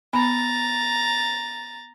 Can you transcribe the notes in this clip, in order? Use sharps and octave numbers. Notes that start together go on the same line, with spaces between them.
B3 A#5 B5 A6